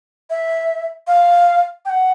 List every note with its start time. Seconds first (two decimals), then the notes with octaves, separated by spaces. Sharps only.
0.30 E5
1.07 F5
1.85 G5
1.89 F#5